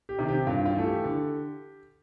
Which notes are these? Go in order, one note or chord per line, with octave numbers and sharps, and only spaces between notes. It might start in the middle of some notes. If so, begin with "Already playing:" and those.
G4
C3 D#3
G4
G2 F4
F4
E3 A3
G4
D3